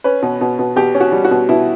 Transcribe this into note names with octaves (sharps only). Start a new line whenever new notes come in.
C#4 B4
B2
B2
B2
B2 G4
C#4
F#4
G3
F#4
B2
B2 E4